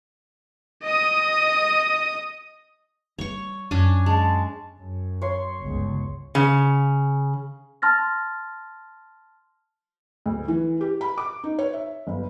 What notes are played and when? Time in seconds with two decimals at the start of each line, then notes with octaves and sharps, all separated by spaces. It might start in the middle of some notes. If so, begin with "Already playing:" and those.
0.83 D#5 D#6
3.19 G3 C#5 C#6
3.71 F#2 C#4 D4 G#5
4.06 G#3 A5
4.77 F#2
5.22 C#5 C6
5.60 G1 C#2
6.35 C#3
7.82 A5 C6 F6 A6 A#6
10.26 D2
10.48 E3
10.81 G4
11.01 B5
11.18 D6
11.44 D#4
11.59 C#5
11.73 E5
12.07 G1